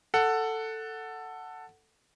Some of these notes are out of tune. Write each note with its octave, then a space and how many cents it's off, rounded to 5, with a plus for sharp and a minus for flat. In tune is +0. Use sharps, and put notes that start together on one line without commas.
A4 +10 F#5 +0